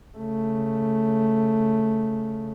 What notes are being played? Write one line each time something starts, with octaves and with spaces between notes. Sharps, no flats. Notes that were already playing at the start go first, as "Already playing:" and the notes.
C#3 A3